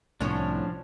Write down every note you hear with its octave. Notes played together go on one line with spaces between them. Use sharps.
C2 A2 F3 C#4 D4 C#5